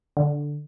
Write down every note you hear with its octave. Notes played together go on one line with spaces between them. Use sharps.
D3